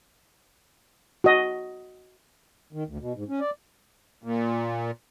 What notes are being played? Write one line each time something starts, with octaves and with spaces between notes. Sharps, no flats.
F#4 D#5
D#3
D2
B2
G#2
C#4
D5
A#2